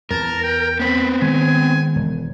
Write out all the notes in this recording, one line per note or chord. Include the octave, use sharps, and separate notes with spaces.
E2 A#4 A5
G5
B3 C4 B5
D#3 G#3 G#5
E1